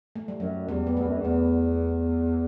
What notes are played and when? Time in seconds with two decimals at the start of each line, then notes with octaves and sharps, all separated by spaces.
0.16 A3
0.28 G3
0.40 F#2 F#3
0.68 E2 G3
0.87 B3
0.97 E2 A3
1.07 F#2
1.18 E2
1.25 B3